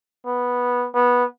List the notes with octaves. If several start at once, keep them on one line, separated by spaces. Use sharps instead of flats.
B3
B3